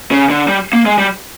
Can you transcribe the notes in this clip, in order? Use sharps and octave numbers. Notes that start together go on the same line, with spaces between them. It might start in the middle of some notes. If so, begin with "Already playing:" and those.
C#3
D3
G3
A#3
G#3
G3